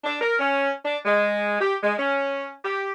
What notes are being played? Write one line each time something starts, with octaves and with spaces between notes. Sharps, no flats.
D4
A#4
C#4
D4
G#3
G4
G#3
C#4
G4